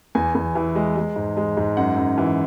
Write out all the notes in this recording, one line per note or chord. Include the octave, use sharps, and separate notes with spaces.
E2 G#5
E2
E3
G#3
G#3
G#2
G#3
G#2
F#2 F#5
F#2
E3